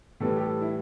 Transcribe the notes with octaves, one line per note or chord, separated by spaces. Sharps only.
A2 E3 G3 A4
G4
A4
E4